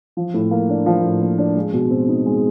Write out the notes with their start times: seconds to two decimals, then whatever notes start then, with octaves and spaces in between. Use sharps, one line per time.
0.17 F3
0.34 A2
0.51 A#3
0.69 D4
0.86 F3
1.03 A2
1.22 A#3
1.38 D4
1.56 G#3
1.73 B2
1.90 C4
2.09 D#4
2.26 G#3